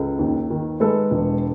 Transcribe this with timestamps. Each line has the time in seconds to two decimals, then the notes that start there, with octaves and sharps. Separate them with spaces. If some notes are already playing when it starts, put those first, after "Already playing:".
Already playing: C#2 A4 B4
0.19 D#2
0.50 D#3
0.80 G#3 A4 B4
1.11 E1